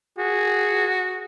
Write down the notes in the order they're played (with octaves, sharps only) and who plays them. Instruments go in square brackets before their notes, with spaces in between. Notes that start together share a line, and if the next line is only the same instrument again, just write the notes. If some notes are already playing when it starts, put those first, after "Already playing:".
[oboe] F#4 [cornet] G#4